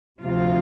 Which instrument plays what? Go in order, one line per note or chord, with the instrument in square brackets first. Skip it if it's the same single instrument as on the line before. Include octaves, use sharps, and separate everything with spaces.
[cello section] D2 C3 F3 F4